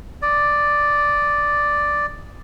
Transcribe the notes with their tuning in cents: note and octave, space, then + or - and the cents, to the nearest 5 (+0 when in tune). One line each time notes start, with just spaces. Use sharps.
D5 +0 D#6 +0